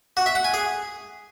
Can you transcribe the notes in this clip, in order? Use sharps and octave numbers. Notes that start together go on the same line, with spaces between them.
F#4
E5
F#5
G#5
G#4